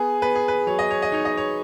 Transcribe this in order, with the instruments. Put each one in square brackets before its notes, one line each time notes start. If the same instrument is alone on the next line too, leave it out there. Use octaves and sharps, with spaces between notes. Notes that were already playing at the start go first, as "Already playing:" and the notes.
Already playing: [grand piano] B3 G#4
B3 B4
G#4
B4
F#3 C#5
D#5
C#5
D#5
D#4 C#5
D#5
C#5